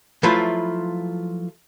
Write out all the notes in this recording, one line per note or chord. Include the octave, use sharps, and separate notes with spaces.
F3 F#3 A3 E4 F4 B4